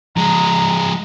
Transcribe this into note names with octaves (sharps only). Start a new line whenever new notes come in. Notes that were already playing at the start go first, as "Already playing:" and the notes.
F3 G#3 A#5